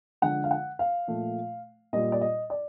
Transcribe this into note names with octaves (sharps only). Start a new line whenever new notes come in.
D3 F3 G#3 F#5
F5
F#5
F5
A#2 F3 A3
A#2 G3 D#5
D5
D#5
D5